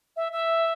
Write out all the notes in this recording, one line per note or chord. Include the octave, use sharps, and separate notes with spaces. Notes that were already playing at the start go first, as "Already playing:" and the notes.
E5
E5